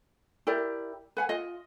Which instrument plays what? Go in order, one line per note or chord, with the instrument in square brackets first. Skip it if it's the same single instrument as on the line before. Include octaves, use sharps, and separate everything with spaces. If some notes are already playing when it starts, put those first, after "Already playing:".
[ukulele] E4 G4 A#4 D5
B4 F#5 G#5
F4 D#5